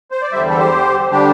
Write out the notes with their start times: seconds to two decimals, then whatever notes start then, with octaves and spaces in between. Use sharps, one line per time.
0.11 C5
0.22 D5
0.32 E2 D3 G3 C5 E5
0.50 A4
0.59 G4 C5
1.12 D3 G3 D4 G4